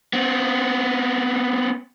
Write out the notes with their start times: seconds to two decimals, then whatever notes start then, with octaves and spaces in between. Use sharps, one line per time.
0.13 B3 C4